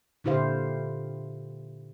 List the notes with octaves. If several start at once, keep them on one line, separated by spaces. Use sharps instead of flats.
A#2 D3 E4 G4 C5 F5